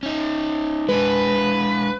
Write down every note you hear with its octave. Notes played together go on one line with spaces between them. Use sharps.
C#4 D#4
G#3 D4 B4